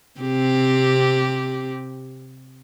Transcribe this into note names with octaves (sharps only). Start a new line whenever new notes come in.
C3 C4 G4